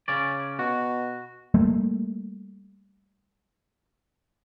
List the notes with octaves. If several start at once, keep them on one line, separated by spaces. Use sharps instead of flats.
C#3 C#4 D5
B2 F#4
G3 A3 A#3